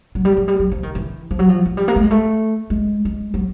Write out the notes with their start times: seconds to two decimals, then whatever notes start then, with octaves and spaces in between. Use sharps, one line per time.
0.15 F#3
0.25 G3
0.37 F#3
0.48 G3
0.60 F#3
0.72 F3
0.83 D#3
0.95 E3
1.31 F3
1.39 F#3
1.49 F3
1.65 F#3
1.77 G3
1.88 A#3
1.96 A3
2.03 G#3
2.11 A3
2.70 G#3
3.05 G#3
3.34 F#3